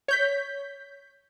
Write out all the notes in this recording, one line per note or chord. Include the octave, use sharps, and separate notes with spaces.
C#5 G6 B6